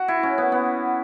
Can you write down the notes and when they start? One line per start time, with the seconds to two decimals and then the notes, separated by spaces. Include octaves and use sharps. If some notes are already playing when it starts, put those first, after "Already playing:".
Already playing: F#4
0.08 E4
0.23 C#4
0.38 B3
0.52 B3